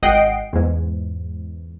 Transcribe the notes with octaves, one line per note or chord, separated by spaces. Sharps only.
G#1 D#5 F#5 G5 C7 D7
E2 G#2